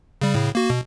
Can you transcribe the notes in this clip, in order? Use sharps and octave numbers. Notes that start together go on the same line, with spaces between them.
C#3 G3
A2 C#3
A#3 F#4
B2